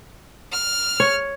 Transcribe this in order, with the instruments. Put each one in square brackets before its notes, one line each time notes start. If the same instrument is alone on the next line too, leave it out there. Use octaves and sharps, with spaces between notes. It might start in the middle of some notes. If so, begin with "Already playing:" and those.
[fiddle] F6
[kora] C#5